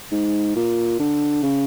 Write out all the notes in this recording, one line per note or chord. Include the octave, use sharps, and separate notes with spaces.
G#2
A#2
D3
C#3